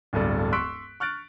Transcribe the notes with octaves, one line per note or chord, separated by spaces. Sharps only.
D1 G1 G2 A4 D5
C6 C#6 E6 F#6 B6 D7
C#6 F6 F#6 A6 D7